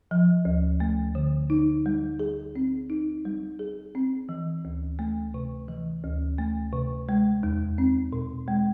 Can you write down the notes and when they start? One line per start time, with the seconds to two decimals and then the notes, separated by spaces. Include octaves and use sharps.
0.11 F3
0.45 D2
0.80 A3
1.15 D3
1.50 D#4
1.86 G3
2.19 G#4
2.56 C4
2.90 D#4
3.25 G3
3.59 G#4
3.95 C4
4.29 E3
4.65 D2
4.99 A3
5.34 C3
5.68 E3
6.04 D2
6.38 A3
6.73 C3
7.09 G#3
7.43 E2
7.78 C4
8.13 B2
8.48 G#3